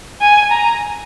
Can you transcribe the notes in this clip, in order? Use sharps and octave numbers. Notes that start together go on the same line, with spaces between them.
G#5
A#5